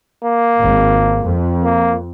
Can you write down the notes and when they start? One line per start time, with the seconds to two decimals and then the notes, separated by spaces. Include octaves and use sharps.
0.24 A#3
0.59 G#1
1.25 F2
1.64 A#3